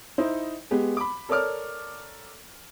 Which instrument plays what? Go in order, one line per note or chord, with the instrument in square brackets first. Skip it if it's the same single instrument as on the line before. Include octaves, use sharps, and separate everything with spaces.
[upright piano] D#4 E4 C5
G#3 B3 G4
B5 D6
A4 A#4 C#5 D5 D6 F6